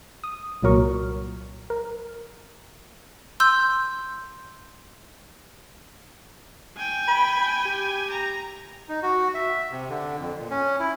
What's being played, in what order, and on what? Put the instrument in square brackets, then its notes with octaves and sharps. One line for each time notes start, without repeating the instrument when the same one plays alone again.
[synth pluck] D#6
C2 A#2 F#3 A#4 C#6
A#4
[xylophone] C6 E6 G6
[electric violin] G5 G#5
[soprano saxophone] B5
G4
[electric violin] A#5
[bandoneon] D#4
F#4
E5
C3
D3
F2
A#2
C#4
E4